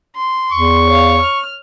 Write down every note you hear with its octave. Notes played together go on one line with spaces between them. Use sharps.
C6
E2 C#6
C#5 F5
F6